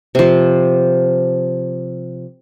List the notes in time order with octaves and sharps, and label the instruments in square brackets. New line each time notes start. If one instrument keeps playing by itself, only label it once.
[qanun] C3 F3